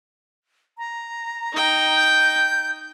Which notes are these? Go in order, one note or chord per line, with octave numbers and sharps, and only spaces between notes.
A#5
D#4 G5
G6